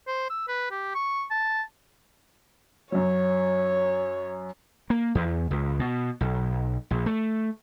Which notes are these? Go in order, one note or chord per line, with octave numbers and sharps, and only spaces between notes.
C5
E6
B4
G4
C#6
A5
F#2 F#3 C#5
A#3
E2
C#2
B2
B1
A#1
A3